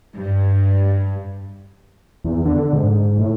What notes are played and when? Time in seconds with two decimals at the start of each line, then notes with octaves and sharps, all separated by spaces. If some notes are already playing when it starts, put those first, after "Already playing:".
0.14 G2
2.24 E2
2.45 D3
2.73 G#2
3.19 A2